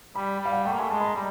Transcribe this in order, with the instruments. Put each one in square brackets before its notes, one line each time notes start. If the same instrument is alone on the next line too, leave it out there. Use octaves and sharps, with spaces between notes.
[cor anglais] G3 [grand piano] B5
[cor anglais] G3
[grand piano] F5
F#5
[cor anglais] A3 [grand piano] G5
[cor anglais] A#3
[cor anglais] A3 [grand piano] G#5
[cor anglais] G#3 [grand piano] A5
[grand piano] B5
A#5
[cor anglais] G3